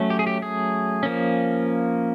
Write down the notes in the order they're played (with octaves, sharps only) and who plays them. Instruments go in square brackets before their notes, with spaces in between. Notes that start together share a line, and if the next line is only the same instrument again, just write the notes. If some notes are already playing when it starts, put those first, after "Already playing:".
Already playing: [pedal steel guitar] F#3 A3 C#4
G4
G#4
G4
G#4
F3 A#3 C#4